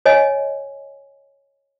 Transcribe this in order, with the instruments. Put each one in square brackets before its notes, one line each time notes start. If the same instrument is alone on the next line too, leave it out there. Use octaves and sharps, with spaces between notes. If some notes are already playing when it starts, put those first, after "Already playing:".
[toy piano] C#5 D#5 G#5